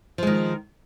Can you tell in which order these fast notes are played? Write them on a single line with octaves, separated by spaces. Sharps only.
F3 G#3 D#3